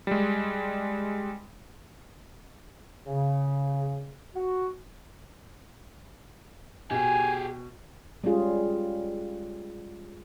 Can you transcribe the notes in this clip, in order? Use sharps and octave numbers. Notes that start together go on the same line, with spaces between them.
G3 G#3
C#3
F#4
B2 G4 G#4 G#5
G3 G#3 C#4 F4 G#4